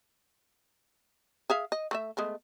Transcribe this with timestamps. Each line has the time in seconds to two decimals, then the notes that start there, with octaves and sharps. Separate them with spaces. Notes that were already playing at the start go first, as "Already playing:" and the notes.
1.50 G#4 E5 F5
1.72 D#5
1.91 A3 C4 E5
2.17 G#3 A3 B3